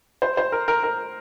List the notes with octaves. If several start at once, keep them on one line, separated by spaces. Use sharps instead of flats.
C5
C5
A#4
A#4
A#4